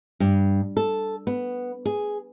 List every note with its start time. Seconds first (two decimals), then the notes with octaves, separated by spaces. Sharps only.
0.20 G2
0.77 A4
1.27 B3
1.86 G#4